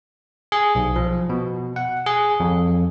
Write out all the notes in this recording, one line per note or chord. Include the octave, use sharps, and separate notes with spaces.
G#4
B1
F3
B2
F#5
G#4
F2